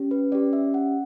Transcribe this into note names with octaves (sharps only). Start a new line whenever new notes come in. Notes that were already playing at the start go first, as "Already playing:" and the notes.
Already playing: C#4 G4
B4
C#4 G4 D5
E5
F#5